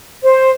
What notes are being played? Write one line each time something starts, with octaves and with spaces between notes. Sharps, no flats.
C5